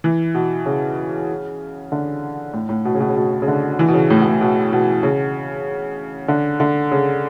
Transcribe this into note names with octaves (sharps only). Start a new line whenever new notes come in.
E3
B2
C#3
D3
A2
A2
B2
C#3
B2
C#3
B2
C#3
D3
E3
B2
C#3
A2
B2
A2
B2
B2
C#3
D3
D3
C#3